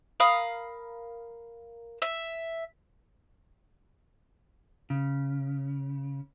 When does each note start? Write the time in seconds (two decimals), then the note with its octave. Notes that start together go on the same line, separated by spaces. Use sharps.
0.20 A#4 F5 B5 D#6
2.02 E5
4.90 C#3